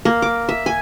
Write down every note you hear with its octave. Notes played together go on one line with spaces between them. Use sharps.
A#3
D6
E5
G#5